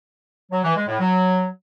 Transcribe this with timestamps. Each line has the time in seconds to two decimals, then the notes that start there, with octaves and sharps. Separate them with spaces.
0.52 F#3
0.64 E3
0.76 G#3
0.88 A2
1.00 F#3